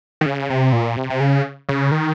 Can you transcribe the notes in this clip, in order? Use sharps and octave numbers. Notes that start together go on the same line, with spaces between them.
D#3
C#3
C3
A#2
C3
C3
C#3
C#3
D#3